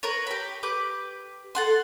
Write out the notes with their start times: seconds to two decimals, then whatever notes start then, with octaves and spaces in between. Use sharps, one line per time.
0.03 A#4 B4 C#5
0.27 G4 B5
0.63 G4 B4 D6
1.55 A4 F#5 C6